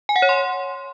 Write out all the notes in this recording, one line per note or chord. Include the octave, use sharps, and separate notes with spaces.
G#5
F#5
C#5
C6